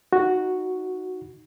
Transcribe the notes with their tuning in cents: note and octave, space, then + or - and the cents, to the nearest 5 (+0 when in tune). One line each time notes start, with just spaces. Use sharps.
D#4 +0 F#4 +0